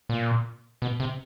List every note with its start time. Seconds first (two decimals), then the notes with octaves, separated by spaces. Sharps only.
0.09 A#2
0.82 B2
1.00 C3